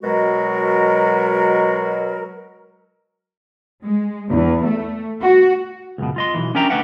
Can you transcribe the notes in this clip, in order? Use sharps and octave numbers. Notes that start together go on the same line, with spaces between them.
B2 F#3 G#3 F#4 A#4
G#3
E2
A3
F#4
C#2 F#2 B2
F4 D#5 C6
B1 F#2 E3
C#4 D4 A#4 E5 G5 A#5
A3 D4 B4 E5 F#5 G5